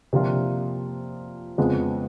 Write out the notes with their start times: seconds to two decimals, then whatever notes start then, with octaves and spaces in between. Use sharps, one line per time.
0.13 C3 F3 A#3 D4 F4
1.58 F2 C#3 F3 G#3 B3